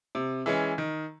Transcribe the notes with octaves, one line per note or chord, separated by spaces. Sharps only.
C3
E3 G#3 C#4
D#3